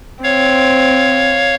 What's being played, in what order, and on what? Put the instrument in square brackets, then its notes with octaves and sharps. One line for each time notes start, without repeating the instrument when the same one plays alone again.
[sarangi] C4 [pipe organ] C#5 F5